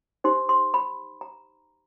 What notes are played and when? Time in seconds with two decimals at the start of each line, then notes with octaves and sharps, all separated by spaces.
0.24 D#4 G4 C5 C6
0.49 C6
0.74 B5
1.21 A#5